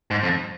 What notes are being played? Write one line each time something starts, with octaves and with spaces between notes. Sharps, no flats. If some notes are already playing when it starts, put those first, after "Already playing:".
G#2
F2